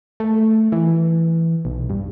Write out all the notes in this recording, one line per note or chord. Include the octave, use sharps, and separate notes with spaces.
A3
E3
B1
G2